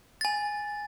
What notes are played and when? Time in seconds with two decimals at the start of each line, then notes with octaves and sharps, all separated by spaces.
0.21 G#5 A6